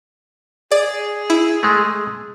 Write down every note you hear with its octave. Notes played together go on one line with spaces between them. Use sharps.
G#4 D5
E4
G#3 A3